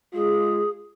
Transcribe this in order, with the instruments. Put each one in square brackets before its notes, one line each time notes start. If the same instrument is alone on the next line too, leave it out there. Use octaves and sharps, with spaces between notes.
[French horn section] G#3 F4 [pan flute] G#4